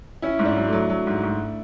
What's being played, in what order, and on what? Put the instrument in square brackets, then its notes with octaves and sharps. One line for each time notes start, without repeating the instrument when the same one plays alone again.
[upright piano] C#4 [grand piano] E4
[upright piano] G#2
[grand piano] D4
[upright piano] F#3
[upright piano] F#3 [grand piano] A3
[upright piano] F#3
G#2
G#2